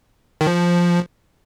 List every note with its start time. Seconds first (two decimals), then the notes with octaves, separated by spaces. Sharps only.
0.41 D#3
0.47 F3